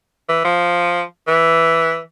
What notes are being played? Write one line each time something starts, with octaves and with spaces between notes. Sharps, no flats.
E3
F3
E3